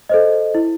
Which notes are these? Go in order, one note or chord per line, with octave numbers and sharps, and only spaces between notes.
A4 C5 D#5
E4